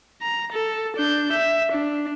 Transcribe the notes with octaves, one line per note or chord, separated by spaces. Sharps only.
A#5
A4
D4 G6
E5
D4